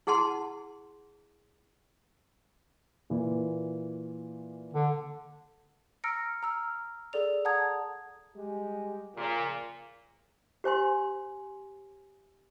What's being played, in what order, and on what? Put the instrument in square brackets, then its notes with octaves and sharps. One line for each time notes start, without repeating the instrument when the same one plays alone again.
[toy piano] E4 G#4 F#5 A5 C6
[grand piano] A#2 E3 A#3
[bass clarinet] D3
[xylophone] A#5 E6 F6 A#6 C#7 D7
A#5 E6 F6
G#4 A4 D5 F7
F#5 A5 A#5 D#6 G#6
[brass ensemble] G3 G#3 G4
[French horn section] A#2 [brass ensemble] C#3 F3
[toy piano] G4 C5 G#5 C6